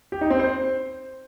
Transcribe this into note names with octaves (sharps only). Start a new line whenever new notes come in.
G4
D#4
C4
C5